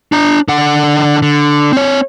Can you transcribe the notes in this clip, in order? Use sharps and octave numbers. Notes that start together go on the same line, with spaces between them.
D4 A#5
D3 F#5
D3
C4 C#5